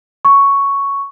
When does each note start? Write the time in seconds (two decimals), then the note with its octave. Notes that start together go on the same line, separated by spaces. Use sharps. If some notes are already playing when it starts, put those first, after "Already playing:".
0.25 C#6